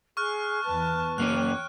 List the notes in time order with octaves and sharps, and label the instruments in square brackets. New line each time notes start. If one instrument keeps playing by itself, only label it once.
[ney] G#4 [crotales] C#6 F6 F#6
[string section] E2 A5 [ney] B4
[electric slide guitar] F#2 A#3 C#4 [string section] C#5 G5 [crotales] F#6